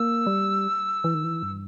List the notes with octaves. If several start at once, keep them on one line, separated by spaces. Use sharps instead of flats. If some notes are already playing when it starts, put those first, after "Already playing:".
Already playing: A#3 E6
G3
E3
D#3
E3
G2